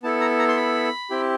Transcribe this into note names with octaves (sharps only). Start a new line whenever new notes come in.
B3 E4 A4 A5
A#5
A#5
C6
B5
C4 E4 G4